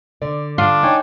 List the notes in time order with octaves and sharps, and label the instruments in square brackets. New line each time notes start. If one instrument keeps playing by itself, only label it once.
[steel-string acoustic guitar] D3 D5
[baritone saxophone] D4 [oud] F4
[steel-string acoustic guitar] D#4 [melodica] C#5 G5 G#5